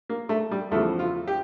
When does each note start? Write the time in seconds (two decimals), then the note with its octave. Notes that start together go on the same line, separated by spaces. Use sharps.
0.09 A#3
0.29 A3
0.51 G3
0.71 E2 C#3 F3 A3
0.99 F4
1.27 G4